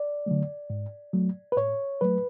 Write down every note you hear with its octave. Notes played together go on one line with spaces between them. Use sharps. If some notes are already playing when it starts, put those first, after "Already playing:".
Already playing: D5
D3 F#3 A3
G#2
F#3 A3
B4
A2 C#5
F#3 A3 B4